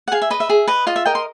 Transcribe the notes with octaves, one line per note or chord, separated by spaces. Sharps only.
F#5
G#4 F5
E5
B4 D#5
E5
G#4
B4 D#5
F4 D#5
E5
A#4 D#5 G5
C6